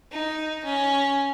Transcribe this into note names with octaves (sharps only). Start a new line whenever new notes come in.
D#4
C#4